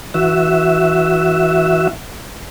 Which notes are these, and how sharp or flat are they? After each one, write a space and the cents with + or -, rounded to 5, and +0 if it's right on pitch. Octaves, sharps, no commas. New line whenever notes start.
E3 -15 F#4 +0 E5 +0